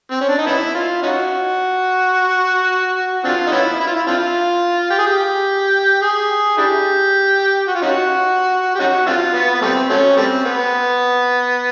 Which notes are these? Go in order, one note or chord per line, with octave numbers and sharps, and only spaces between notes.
C4
C#4
D4
D#4
B3 C#4 E4
F4
C#4 D#4 F#4
C4 D4 F4
D#4
B3 C#4 E4
E4
F4
E4
C4 D4 F4
G4
G#4
G4
G#4
D4 E4 G4
F#4
F4
C#4 D#4 F#4
G4
C#4 D#4 F#4
C4 D4 F4
B3
B3
G3 A3 C4
F#3 A3 C#4
G3 A3 C4
B3